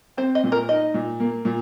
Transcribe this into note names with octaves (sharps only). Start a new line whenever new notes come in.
C4 C5
D#5
A#2
A#4
D#4 D#5
A#2
A#3
A#2